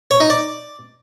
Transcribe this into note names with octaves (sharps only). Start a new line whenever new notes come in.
C#5
D#4
D5